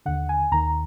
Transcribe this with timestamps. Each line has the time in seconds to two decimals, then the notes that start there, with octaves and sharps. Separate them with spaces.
0.06 D#2 D3 F#5
0.29 G#5
0.52 D#2 D#3 A#5